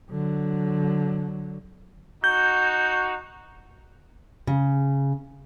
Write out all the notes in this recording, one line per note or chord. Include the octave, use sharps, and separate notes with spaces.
D3 F#3
D#4 F#4 G6
C#3